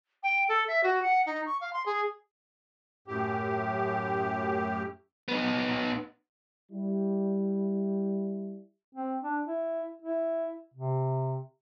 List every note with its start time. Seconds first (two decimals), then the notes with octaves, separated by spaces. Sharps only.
0.23 G5
0.48 A4
0.68 E5
0.83 F#4
1.02 F#5
1.26 D#4
1.46 C#6
1.61 F5
1.73 C6
1.86 G#4
3.08 F#2 A2 G4
5.28 B3 D#4
6.71 G3 E4
8.95 C4
9.23 D4
9.46 E4
10.02 E4
10.74 C3